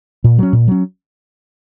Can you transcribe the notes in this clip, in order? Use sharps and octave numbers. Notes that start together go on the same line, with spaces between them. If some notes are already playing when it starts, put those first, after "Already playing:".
A#2
F#3 C#4
A#2
F#3 C#4